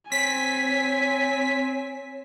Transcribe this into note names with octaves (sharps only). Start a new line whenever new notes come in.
C4 C#5 G#5 B6